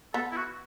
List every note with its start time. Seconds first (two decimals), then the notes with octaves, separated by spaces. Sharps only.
0.14 B3 A4
0.32 E4
0.36 F#4